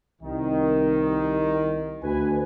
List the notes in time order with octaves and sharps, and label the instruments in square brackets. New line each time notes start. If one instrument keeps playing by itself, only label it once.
[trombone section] C2 [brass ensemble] D#3
[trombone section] D2 [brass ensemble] B4 G#5